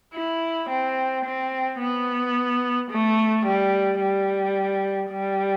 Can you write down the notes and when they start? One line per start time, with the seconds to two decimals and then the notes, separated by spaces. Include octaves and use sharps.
0.14 E4
0.69 C4
1.25 C4
1.80 B3
2.91 A3
3.46 G3
4.00 G3
5.11 G3